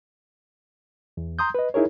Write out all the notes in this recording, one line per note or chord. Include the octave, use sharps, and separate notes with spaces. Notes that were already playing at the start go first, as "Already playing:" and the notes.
E2
A#5 C6 D#6 G6
B4 D#5
D#4 E4 G#4 A#4 C#5